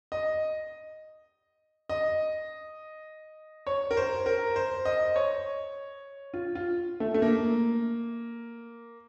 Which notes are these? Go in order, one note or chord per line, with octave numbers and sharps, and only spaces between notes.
D#5
D#5
C#5
A#4
C5
A#4
C5
D#5
C#5
F4
F4
A3
A3
A#3